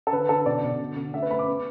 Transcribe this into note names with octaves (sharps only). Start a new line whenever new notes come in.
A4
D3 B4
D3 A4
B2 D5
B2
D3
D3
A3 E5
B4
A3 B5
D6
B3